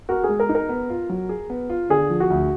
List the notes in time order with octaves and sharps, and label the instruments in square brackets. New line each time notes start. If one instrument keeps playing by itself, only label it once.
[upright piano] F#4 [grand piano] A#4
[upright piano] G#4
[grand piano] G#3
[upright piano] A#4
[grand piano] D#4
[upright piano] A#4
[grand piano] B3
F4
F#3
G#4
B3
F4
[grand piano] D3 [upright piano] G#4
[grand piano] F3
[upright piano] F#4
[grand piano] D2